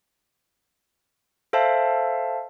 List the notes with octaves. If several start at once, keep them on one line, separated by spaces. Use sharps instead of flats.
A4 C5 E5 F5 A5